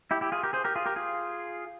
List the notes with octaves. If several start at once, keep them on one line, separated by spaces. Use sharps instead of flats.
E4 G4
E4 G4
F4 G#4
G4 A#4
G#4 C5
G4 A#4
F4 G#4
G4 A#4
F4 G#4